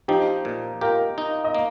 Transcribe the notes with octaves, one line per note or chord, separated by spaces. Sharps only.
F3 D#4 G4
A#2
F4 G4 A#4
D#4
D#5
A#3